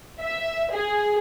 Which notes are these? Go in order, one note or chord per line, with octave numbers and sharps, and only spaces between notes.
E5
G#4